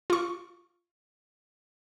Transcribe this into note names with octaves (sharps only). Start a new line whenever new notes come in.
F4 C#6